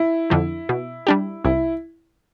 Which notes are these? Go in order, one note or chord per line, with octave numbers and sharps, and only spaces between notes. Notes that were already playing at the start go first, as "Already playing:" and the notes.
Already playing: E4
F2 D3 F3
B2
G3 D4 G4
C2 E4